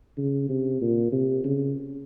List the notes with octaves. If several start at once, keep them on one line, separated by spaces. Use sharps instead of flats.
C#3
C3
A#2
C3
C#3